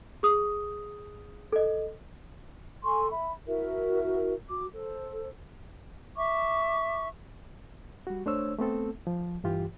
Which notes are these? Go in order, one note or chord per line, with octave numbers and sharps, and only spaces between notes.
G#4 D#6
A4 D#5
A4 G#5 C6 C#6
E5 B5
E4 F#4 A#4 E5
F#4 D6
A4 C5
E5 C#6 D6
G3 F#4
A3 D4 C5 C#5 E6
A3 B3 C4 A4
F3
G2 E3 F4 G4